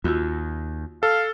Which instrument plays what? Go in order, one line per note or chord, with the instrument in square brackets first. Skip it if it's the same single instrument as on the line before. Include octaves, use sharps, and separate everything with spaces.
[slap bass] D#2 [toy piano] F4 F#4 E6
[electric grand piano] A4 [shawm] F5